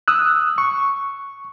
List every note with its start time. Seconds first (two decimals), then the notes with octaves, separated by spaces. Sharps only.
0.08 D#6 E6 F#6
0.58 C#6